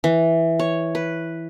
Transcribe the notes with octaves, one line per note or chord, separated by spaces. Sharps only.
E3
C#5
B4